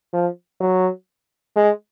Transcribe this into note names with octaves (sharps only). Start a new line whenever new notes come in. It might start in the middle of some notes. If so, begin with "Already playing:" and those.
F3
F#3
G#3